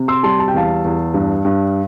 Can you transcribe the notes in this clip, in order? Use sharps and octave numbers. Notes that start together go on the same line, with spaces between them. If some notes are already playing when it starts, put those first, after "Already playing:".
Already playing: C3
C6 E6
G3 A5 C6
A5
G5
E2 F5 A5
E2
G2
G2